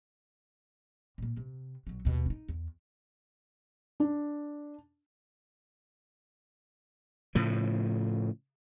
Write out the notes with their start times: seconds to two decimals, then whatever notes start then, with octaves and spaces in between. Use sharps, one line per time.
1.18 A#2 A#3
1.37 C3
1.87 B1 F#3
2.05 D#2 B2
2.26 C#4 D#4
2.48 E2
4.00 D4
7.35 A2 C#3 F3